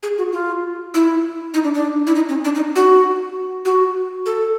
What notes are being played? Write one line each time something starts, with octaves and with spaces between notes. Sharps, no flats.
G#4
F#4
F4
E4
D#4
D4
D4
E4
D#4
C#4
D4
D#4
F#4
F#4
A4